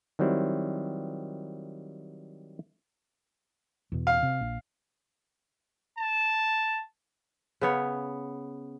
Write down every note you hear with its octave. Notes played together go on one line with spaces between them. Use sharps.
D#3 F#3 G3 C4 E4
E2 B2
F5
C3
A#1
A5
C#3 B3 C#5